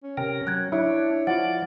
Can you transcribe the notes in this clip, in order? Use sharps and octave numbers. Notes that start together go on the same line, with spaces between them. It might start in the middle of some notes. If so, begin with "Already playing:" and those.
C#4
C3 A#4 G5
F#3 F#6 G#6
D4 E4 C#5
F3 F4 D5 F#5